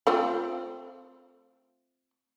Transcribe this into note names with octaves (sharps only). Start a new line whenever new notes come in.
A3 C4 F4